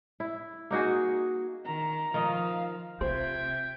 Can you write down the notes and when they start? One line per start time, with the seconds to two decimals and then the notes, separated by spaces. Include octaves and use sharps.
0.20 E4
0.71 A#3 D#4 F#4 G#4
1.66 D#3 A#5
2.14 D#3 F3 D#5 F5
3.01 C3 F4 C5 E5 G5 G#6